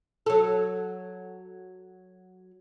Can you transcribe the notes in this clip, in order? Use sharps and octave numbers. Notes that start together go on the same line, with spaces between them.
F#3 A4